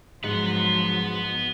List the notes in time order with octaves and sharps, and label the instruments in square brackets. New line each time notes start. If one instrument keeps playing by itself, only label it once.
[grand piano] G#2 [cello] F3 F#3 [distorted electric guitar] B4 F#5